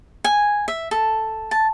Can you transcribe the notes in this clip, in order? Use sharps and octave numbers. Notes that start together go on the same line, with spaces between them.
G#5
E5
A4
A5